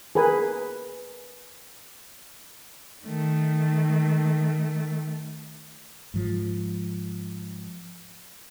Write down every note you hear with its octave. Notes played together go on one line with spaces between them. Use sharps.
G#4 A#4 B4 G#5 B5
D#3 A3
G#2 F3